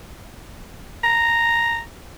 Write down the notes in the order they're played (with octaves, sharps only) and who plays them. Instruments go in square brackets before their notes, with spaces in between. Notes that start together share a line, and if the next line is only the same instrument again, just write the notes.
[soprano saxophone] A#5